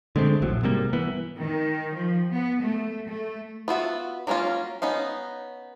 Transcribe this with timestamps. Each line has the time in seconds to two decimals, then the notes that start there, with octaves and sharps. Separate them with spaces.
0.16 D3 G#3 A3 C4
0.42 E1 A#1 A2 F#3
0.63 G#2 C3 G3 A#3
0.93 E3 B3
1.39 D#3
1.95 F3
2.32 B3
2.61 A3
3.09 A3
3.68 B3 F4 F#4 E5
4.27 F#3 A#3 C4 C#4 F4
4.82 B3 C#4 D#4 F5